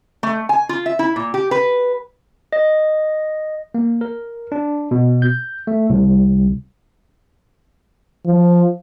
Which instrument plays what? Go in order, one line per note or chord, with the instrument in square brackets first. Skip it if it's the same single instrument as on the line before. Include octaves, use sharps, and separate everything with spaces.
[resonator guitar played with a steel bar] A3
G#5
F4
E5
E4
A#2
G4
B4
[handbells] D#5
[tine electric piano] A#3
A#4
D4
B2
G6
A3
C2
[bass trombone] F3